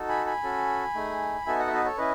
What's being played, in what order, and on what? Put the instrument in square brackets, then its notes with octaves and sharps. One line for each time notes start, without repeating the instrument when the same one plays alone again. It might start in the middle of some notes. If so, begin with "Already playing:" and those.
Already playing: [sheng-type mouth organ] D#4 F#4 A4
G#5 B5
G#5 B5
C#4 F#4 A4
A3 D#4 G#4
B3 D#4 F#4 A4 E5 G#5
D#5 F#5
E5
B4 D#5
A4 C#5
C#4 E4 B4 D#5